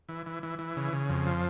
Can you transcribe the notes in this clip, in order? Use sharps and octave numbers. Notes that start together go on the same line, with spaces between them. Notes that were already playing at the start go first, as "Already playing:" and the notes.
E3
E3
E3
E3
C#3
C#3
F2
F3